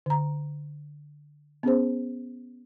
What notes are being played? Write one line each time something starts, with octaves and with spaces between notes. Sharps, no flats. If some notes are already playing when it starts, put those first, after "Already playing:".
D3 A#5
B3 C#4 G#4 C5